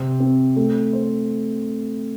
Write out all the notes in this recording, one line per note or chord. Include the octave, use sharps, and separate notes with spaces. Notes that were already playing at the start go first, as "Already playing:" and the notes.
Already playing: C3 C4
C4
A3
C5